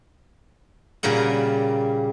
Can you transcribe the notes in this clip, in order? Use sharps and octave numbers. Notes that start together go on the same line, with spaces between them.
A#2 C#3 G3 A#4 F#5